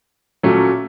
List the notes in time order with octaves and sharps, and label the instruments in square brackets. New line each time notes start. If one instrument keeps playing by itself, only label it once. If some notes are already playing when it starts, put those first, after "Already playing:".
[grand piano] A#2 F#3 A3 C#4